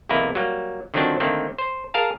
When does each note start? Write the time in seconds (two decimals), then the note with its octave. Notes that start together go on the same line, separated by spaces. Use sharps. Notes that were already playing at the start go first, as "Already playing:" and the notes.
0.09 B1 E2 C3 A#3 E4 B4
0.35 F#3 G3 A#3
0.94 D3 D#3 F3 F#3 C4 D4
1.20 D3 D#3 A3 A#3 C4
1.58 C5
1.94 G#4 A#4 F5 A5